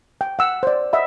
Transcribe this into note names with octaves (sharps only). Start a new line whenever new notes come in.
G5
F#5 E6
C5 D5
D#5 E5 F#5 B5